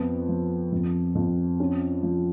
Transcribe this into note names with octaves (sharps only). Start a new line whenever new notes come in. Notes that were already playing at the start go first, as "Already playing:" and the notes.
Already playing: F2 B3
F3
F2
F2
C#4
F3